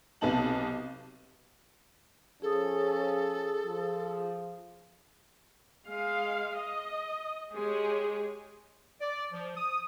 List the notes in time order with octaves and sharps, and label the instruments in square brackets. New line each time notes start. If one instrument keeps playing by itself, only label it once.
[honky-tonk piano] B1 C3 B3 D#4 A5 F#7
[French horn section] F3 C#4 [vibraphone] G#4 D#6 [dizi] A4
[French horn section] F3
[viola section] G#3 F5
D#5
G#3 G4 G#4 C#5
[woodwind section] D5
F3
D#6